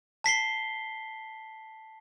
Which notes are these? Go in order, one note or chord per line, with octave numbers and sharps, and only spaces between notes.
A5 B6 C7 G7